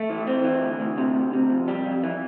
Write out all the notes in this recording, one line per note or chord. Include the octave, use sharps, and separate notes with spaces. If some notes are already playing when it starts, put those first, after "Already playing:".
Already playing: A3
E3
C4
E3
D2
D2
C3
D2
C3
F2
G3
F2
E3